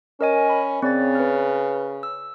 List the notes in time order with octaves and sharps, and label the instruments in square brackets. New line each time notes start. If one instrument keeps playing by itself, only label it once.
[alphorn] C#4 [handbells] A#4 D#5 G#5
[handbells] B5
[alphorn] C#3 [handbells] C4 D5 A6
[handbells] B4 F6
E6